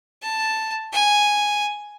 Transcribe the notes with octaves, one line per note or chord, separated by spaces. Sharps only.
A5
G#5